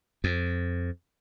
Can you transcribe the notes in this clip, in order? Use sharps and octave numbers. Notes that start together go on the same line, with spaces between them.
F2